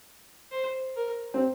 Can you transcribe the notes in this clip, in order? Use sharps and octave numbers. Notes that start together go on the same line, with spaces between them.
C5
A#4
C4